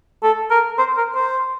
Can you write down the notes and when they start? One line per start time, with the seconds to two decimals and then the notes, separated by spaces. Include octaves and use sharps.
0.23 A4
0.51 A#4
0.78 C5
0.97 A#4
1.15 C5